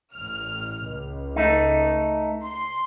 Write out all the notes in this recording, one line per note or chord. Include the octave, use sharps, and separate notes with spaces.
A1 F6
C#2
A3 D#4
C6